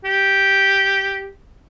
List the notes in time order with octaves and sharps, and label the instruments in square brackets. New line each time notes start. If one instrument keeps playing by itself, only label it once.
[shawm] G4